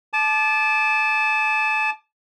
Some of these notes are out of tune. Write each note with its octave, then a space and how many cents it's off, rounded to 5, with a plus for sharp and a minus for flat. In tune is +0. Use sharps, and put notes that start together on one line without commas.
A5 -25 D6 +20